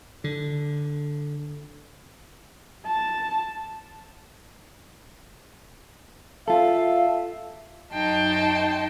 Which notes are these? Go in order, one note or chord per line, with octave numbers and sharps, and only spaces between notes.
D3
A5
F4 A4 E5 F5
F#2 D#4 G5 A5 C6